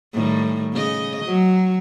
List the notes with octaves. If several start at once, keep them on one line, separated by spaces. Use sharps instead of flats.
A2 D#3 G3
C#3 D#5
F#3